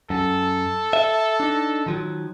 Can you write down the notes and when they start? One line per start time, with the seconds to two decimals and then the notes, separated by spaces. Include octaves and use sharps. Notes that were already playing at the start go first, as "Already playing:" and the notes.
0.10 F#2 A4
0.93 E5
1.40 D4 D#4
1.86 D#3 F3 F#3